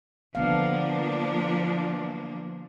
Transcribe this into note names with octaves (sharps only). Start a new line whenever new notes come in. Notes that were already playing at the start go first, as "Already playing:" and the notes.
D3 F3 A#3 B3 D4 F5